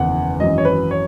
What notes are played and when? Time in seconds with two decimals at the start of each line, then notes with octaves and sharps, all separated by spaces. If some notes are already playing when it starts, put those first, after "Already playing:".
Already playing: F#1 E2 D#3 F#5
0.40 G#1 F#2 E3 D#5
0.58 C#5
0.65 B4
0.91 C#5